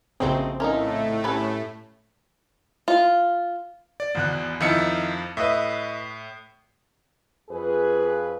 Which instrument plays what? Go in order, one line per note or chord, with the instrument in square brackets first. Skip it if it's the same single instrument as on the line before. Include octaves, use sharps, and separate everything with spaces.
[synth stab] A#1 C#3 C4 [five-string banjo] A3 D#4 G#4 [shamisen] F#4 G5
[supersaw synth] A2 A3 [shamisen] C#4 A#4 [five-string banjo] D#4 F4
[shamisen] G3 C#4 [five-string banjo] B4 A5
[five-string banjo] F4
[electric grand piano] D5
[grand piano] G#1 E2 F#6
[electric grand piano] F2 F3 C#7 [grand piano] D#3 E4
[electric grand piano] A2 [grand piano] B4 D#5 E5
[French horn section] F2 G#4 B4